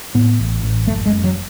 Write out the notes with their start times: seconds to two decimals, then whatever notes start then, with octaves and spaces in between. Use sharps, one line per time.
0.15 A2 B3
0.40 A1
0.63 A1
0.87 F#1 A3
1.06 G#3
1.12 F#2
1.24 F#3